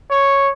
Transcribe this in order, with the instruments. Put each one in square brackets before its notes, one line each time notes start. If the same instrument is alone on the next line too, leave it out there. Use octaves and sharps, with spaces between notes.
[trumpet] C#5